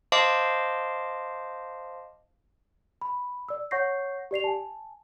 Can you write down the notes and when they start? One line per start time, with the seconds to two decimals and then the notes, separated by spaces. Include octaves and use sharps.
0.12 C5 D#5 F5 A5 C6 D6
3.02 B5
3.49 D5 E6
3.71 C#5 F#5 C#6 G6 A#6 C7
4.31 G4 D5 C7 F7
4.44 G#5 A5